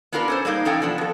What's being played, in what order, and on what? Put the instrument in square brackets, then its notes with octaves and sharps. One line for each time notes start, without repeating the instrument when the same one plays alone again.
[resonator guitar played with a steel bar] B3 D4 F4 G4 A#4 B4
C#4 A4 C5
G3 G#3 A#3 D#4
E3 C#4 D#4 A4 F5 G5
C3 F3 B3 D4
F2 A4